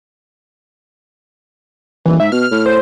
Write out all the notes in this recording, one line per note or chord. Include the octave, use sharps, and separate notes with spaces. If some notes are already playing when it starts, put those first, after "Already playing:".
D#1 E3
G#2 E5
B2 F6
A2
C5